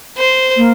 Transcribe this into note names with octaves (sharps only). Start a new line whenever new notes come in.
C5
A#3